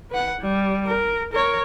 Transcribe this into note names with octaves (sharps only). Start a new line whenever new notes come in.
B4 F#5
G3
A#4
A#4 C#5